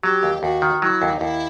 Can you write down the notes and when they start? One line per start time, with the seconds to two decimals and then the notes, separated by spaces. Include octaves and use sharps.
0.03 F#3 G4
0.23 D#2
0.43 D#2 F#4
0.62 D#3
0.82 F#3 E4
1.02 D#2
1.13 D#4
1.21 D#2 E4